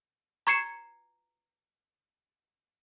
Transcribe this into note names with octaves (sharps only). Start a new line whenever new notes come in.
A#5 C#6 G#6 C7 C#7 E7